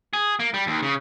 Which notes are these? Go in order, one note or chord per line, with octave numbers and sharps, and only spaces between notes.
G#4
A#3
G3
D#2
C#3